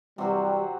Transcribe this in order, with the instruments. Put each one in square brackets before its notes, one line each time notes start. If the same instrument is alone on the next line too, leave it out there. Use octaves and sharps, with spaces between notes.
[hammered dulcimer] C3 F#3 C4 F#4 [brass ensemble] E3 G3